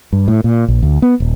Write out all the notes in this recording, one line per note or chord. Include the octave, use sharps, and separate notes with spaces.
G2
A2
A#2
A#1
D2
B3
D#1